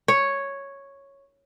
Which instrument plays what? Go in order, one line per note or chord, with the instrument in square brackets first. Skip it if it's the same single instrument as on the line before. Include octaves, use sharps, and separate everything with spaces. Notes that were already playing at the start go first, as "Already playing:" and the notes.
[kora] C#5